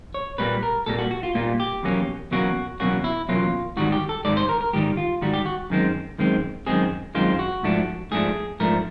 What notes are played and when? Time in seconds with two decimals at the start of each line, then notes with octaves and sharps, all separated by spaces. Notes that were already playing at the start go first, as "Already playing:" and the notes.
0.14 C#5
0.38 A#2 G3 A#3 B4
0.63 A#4
0.86 A#2 G3 A#3 A4
0.98 F#4
1.11 F#4
1.23 F4
1.35 A#2 G3 A#3 F4
1.60 G4
1.83 E2 B2 F#3 A#3 C#4
2.31 E2 B2 F#3 A#3 C#4 F#4
2.80 E2 B2 F#3 A#3 C#4 F#4
3.04 E4
3.29 E2 B2 F#3 A#3 C#4 F4
3.77 G#2 D#3 G3 F#4
3.92 G4
4.09 A4
4.25 G#2 D#3 G3 D5
4.37 C5
4.49 A#4
4.61 A#4
4.73 G#2 D#3 G3 G4
4.97 F4
5.22 G#2 D#3 G3 F#4
5.34 G4
5.46 F#4
5.70 F#2 D#3 G#3 C4
6.18 F#2 D#3 G#3 C4
6.67 F#2 D#3 G#3 C4 G#4
7.15 F#2 D#3 G#3 C4 F4
7.28 F4
7.39 F#4
7.63 G#2 F3 A3 D4
8.11 G#2 F3 A3 D4 G#4
8.60 G#2 F3 A3 D4 A#4